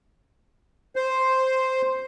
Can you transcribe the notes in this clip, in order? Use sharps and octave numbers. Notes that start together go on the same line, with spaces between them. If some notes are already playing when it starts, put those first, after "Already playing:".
C5